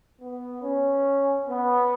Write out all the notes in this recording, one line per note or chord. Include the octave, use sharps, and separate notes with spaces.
B3
C#4
B3